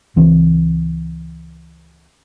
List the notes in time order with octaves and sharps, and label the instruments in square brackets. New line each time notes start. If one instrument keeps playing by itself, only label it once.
[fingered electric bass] C#2 E3 C4